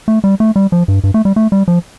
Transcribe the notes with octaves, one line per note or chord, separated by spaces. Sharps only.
A3
G3
A3
G3
F3
G2
G2
A3
G3
A3
G3
F3